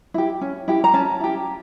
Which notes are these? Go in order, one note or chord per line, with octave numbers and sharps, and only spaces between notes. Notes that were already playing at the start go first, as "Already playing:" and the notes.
E4 G4
C#4
E4 G4
A#5
C#4 A5
E4 G4